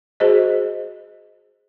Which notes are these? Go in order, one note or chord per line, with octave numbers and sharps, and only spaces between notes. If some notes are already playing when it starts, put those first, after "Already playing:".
F#4 G#4 C5 D#5